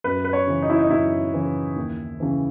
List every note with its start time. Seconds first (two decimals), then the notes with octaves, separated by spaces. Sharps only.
0.04 F#2 B4
0.24 B4
0.33 C#5
0.47 C#3 E3
0.62 D#4
0.70 E4
0.79 D#4
0.91 F#2 E4
1.33 C#3 E3
1.76 D#2
2.20 C#3 E3